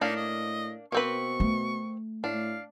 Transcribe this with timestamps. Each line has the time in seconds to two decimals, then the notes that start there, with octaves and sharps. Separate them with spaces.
0.01 A2 A#3 D4 D#4 F5
0.16 D#5
0.92 B2 A#3 C4 B4 C#6
1.40 A3
2.24 A2 D4 F5